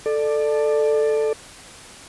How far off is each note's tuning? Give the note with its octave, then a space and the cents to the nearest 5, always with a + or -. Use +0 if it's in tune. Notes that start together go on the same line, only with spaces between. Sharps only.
A4 +0 D5 +20